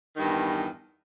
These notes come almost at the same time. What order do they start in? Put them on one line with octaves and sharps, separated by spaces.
D#3 G2 E2